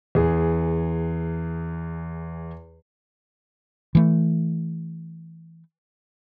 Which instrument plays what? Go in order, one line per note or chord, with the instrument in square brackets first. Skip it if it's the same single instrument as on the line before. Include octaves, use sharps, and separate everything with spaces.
[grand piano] E2 G#4
[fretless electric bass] E3 A3